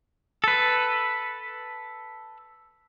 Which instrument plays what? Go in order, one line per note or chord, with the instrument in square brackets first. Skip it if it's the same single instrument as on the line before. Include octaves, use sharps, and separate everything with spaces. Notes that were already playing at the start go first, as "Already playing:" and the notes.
[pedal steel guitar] A4 B4